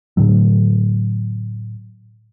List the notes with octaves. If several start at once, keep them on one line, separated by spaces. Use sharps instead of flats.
A2 D3 F#3